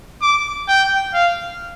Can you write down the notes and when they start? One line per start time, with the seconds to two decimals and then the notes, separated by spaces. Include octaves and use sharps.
0.22 D6
0.69 G5
1.14 F5